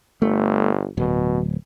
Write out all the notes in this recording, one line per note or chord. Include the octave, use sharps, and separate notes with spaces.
G1 A3
D1 B2